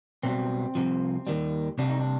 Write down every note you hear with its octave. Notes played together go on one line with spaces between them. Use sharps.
B1 B2 G3 C4
C2 C3 F3
D#2 D#3 G3
C2 C3 G3 D4
D#4
D4